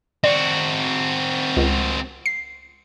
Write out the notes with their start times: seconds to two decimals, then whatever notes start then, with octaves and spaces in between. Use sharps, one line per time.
0.24 C4 F#4 D5
1.57 C#2
2.26 C7